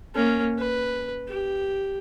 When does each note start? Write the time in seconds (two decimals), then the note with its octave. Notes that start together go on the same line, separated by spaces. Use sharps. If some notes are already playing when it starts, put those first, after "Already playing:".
0.15 A#3 C#4
0.59 B4
1.28 G4